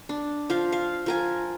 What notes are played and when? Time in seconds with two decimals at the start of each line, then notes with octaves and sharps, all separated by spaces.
0.09 D4
0.50 F3 F5
0.72 F5
1.06 F3 A#4 G#5